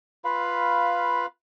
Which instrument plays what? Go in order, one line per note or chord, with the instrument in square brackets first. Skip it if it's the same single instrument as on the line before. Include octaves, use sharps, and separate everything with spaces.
[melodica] F4 B4 F5 B5